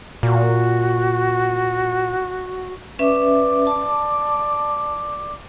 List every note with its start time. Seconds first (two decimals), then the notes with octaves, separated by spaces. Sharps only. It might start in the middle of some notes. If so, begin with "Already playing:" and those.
0.23 A#2 F#4
2.99 C#4 B4 D5 E5
3.67 A5